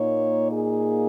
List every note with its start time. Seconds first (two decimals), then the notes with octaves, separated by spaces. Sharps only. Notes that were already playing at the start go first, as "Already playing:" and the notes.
Already playing: A#2 A#3 D#4 C#5
0.52 G#4